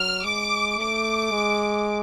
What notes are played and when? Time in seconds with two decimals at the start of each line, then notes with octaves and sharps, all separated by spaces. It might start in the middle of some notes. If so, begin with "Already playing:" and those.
Already playing: F#3 F6
0.24 G#3 D6
0.78 A3 D6
1.31 G#3